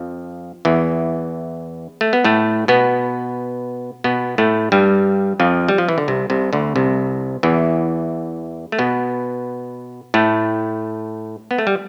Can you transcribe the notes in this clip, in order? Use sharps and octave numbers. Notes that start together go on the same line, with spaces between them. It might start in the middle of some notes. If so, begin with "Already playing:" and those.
Already playing: F2 F3
E2 E3
A3
B3
A2 A3
B2 B3
B2 B3
A2 A3
G2 G3
F2 F3
G3
F3
E3
D3
C2 C3
C2 C3
D2 D3
C2 C3
E2 E3
A3
B2 B3
A2 A3
B3
A3
G3